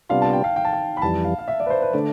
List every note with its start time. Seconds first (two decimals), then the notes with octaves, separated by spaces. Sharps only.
0.10 C3 G3 B3 D4 F4 F5
0.22 A5
0.33 G5
0.44 F5
0.56 G5
0.65 A5
0.73 G5
0.97 B5
1.02 F2 E3 G3 A5
1.25 F5
1.38 F5
1.48 E5
1.60 D5
1.66 B4
1.70 C5
1.82 B4
1.93 D3 A3 D4 D5